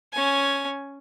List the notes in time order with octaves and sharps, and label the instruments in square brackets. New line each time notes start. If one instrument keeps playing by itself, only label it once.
[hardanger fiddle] C#4 G#5